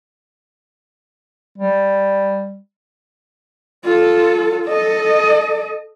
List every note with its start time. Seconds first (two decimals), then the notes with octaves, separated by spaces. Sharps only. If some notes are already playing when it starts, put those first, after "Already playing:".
1.58 G3
3.85 F4 A4
4.66 A4 D#5